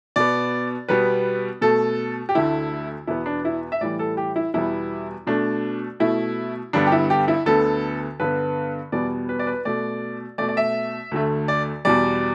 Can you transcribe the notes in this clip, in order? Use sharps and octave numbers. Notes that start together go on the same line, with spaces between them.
B2 B3 D5
B2 G3 B3 B4
B2 A3 A4
G4
D2 D3 A3 E4
E2 B2 B3 E4
D4
E4
E5
A2 E3 G3 D5
A4
G4
E4
E2 B2 G3 B3 E4
B2 A3 D4
B2 A3 E4
G2 D3 G3 B3 D4
G4
E4
G4
E4
D2 D3 B3 A4
G2 D3 B3 B4
E2 B2 G3 B3 D5
B4
D5
B4
B2 A3 D5
B2 A3 D5
D5
E5
D2 D3 A3
D5
E2 B2 G3 D5